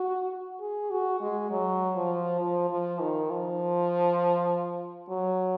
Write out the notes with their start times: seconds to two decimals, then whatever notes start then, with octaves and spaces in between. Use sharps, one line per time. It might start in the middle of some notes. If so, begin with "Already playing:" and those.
Already playing: F#4
0.61 G#4
0.91 F#4
1.21 G#3
1.51 F#3
1.96 F3
2.41 F3
2.70 F3
3.01 D#3
3.30 F3
5.10 F#3